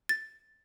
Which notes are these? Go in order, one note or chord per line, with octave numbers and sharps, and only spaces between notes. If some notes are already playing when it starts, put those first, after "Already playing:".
A6